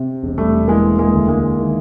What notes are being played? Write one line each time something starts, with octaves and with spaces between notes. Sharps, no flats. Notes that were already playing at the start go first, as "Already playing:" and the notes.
Already playing: C3
E1
G3 A3
E3 G#3 A#3
G#3 A#3
D2
G#3 A#3
D#3